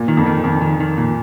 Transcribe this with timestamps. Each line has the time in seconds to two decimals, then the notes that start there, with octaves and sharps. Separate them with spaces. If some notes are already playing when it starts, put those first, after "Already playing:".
Already playing: A#2
0.08 D#3
0.17 F2
0.26 D#3
0.44 F2 D#3
0.61 D#3
0.80 D#3
0.98 A#2